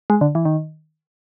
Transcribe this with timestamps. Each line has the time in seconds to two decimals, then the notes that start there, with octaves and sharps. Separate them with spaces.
0.10 G#3
0.21 D3
0.35 E3
0.45 D#3